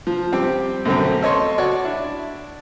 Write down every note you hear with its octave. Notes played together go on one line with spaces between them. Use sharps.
F3
G3 C4 G4
F#2 B2 D3 A3 C4
A4 C#5 D#5 C6
F#4 C#5 D5 C#6
D4 E4